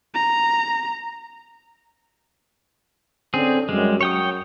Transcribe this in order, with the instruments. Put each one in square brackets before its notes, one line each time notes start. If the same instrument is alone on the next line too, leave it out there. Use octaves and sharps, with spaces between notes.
[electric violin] A#5
[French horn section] D3 C#4 [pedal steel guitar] C4 G#4
[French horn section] F#2 [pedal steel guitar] G3 G#3
[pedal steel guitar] C#5 G5 D#6